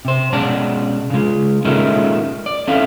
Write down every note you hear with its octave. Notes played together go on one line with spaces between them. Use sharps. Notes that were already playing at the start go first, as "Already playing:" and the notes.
C3 C5
B2 G#3 C#4 D5 A5
C#3 G#3
A#2 D#3 G#3 A3 C#4 E4
D5
A3 C4 C#4 E4 A4 F5